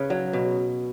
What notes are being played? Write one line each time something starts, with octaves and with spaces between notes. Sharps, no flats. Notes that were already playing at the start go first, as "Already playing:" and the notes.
Already playing: C#3 B4
F#3
B2